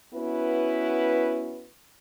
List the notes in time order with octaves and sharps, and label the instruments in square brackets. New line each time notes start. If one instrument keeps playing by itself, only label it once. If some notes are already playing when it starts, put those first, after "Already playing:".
[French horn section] B3 C#4 E4 F#4 B4